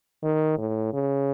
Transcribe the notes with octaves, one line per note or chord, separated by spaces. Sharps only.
D#3
A2
C#3